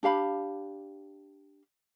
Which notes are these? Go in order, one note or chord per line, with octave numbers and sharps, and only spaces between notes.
D4 G4 F5 B5